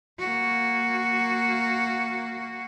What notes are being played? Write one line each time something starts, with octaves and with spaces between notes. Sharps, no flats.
A#3 F#4